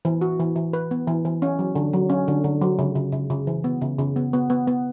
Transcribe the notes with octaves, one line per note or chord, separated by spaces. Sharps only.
E3
F#4
E3
E3
B4
B3
E3
E3
C#4
F#3
D3
F#3
C#4
D3
D3
F#3
C#3
C#3
C#3
C#3
E3
B3
C#3
C#3
B3
B3
B3
B3